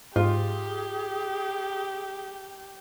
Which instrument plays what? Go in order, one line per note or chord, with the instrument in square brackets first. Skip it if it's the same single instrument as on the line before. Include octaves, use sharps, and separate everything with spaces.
[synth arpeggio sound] G#2 [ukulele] F4 [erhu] G4 [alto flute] G#4